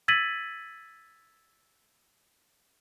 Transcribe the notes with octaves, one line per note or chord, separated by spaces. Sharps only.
E6 G#6 A6 B6 D#7 F#7